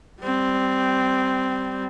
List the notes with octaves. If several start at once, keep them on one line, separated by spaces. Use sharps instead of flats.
G3 C4